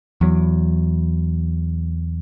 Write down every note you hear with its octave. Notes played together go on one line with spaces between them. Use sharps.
E2 F#3